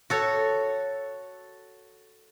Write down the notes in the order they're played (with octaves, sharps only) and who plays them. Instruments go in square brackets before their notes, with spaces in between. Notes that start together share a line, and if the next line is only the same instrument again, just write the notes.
[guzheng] F#4 A4 C#5